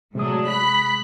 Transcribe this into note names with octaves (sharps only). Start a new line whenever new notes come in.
A2 C3 F#3 G#3 D4 D#6
B5 F#6 B6